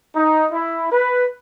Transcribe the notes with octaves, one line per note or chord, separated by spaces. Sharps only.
D#4
E4
B4